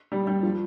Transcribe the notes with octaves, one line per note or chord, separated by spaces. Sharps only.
G3
G3
F3